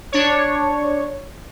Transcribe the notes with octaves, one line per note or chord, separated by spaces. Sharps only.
D4 C#5